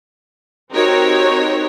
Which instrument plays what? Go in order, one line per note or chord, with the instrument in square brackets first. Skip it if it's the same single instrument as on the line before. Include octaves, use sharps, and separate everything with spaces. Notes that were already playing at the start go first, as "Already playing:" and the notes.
[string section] C4 D#4 F#4 G4 A#4 C#5